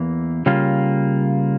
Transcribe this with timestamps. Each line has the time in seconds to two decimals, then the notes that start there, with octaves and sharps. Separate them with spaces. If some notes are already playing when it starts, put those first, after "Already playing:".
Already playing: E2 E3 A#3
0.46 C#3 G3 A#3 F4